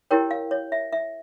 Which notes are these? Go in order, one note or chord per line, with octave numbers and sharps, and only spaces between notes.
E4 G4 A#4 C#5 G5
F5
C#5
E5
E5